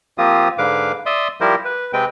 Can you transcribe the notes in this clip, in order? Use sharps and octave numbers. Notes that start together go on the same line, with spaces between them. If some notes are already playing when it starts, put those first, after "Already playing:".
F3 A#3 C4 F4 G4 D#6
G#2 D3 B4 F5 D6
D5 E5 C6 D#6
F3 G3 E4 G4 A#4 C5
B4
C3 G#3 C4 B4 G5